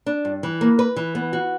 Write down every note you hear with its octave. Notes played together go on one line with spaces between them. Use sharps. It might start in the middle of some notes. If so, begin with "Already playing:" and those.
D4
G2
E3
A#3
B4
E3
B3
F#4